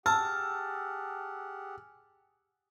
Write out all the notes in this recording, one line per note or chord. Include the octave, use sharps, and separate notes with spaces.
G4 G#4 F#5 A5 E6 F6